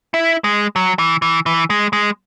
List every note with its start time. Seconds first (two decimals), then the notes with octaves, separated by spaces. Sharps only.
0.14 E4
0.44 G#3
0.76 F#3
0.99 E3
1.22 E3
1.46 E3
1.70 G#3
1.93 G#3